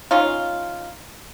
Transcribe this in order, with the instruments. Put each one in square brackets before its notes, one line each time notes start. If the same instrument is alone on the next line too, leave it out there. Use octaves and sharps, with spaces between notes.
[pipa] C#4 D#4 F4